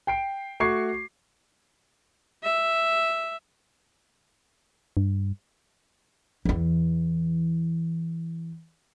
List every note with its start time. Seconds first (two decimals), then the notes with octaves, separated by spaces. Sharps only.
0.07 G5 C7 D7
0.60 A3 F#4 C#6 D6 G#6 C7
2.43 E5
4.97 G2
6.45 E2 E3